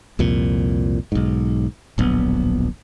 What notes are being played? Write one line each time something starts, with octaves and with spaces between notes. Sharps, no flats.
C2 F2 A#2
B1 G#2
D1 A#1 F#3 B3